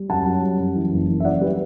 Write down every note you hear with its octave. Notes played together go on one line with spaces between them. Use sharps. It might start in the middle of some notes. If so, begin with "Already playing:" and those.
Already playing: G3
F#2 F#5 A5
F#2
G3
F#2
E3
F#1
E3
E5
F#2 D5 F#5
G3 G4 B4